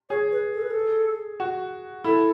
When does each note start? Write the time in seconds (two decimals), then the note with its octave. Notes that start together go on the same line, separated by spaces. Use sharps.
0.10 G#4 C#5
0.32 B4
0.53 A4
0.62 B4
0.71 A4
1.40 F#4
2.04 E4 A4